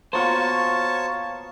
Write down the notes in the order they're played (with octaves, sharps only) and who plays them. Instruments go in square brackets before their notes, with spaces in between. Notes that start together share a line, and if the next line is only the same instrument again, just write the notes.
[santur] A#3 B3 F4 [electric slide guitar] F#4 C5 [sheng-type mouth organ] C#5 A5